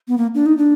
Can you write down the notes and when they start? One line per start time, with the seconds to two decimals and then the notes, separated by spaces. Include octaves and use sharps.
0.08 B3
0.18 A#3
0.35 D4
0.46 D#4
0.57 D4